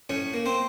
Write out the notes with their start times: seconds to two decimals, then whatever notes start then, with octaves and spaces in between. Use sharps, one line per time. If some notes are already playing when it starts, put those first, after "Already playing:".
0.09 A2 C#4 C#5
0.34 A#3
0.46 C4 C5